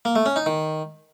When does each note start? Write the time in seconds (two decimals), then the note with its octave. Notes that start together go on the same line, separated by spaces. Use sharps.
0.05 A#3
0.15 A3
0.26 C#4
0.36 D#4
0.46 D#3